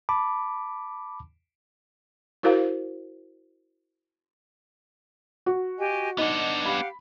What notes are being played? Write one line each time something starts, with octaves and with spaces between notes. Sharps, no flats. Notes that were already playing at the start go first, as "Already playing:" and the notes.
A5 B5 D6
E4 F#4 A#4 C5 F5
F#4
G4 D#5 G#5
B3 D4 D#4 F#5
G4 F5 F#5 B5